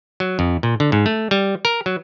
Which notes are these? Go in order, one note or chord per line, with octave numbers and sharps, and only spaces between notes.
F#3
F2
A#2
D3
G#2
A3
G3
A#4
F#3